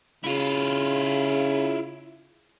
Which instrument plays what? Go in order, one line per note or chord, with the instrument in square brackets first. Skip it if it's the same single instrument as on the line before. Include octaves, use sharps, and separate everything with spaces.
[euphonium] C#3 [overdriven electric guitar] E4 F4